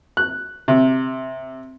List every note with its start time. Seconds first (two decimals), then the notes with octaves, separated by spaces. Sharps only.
0.17 F#6
0.68 C3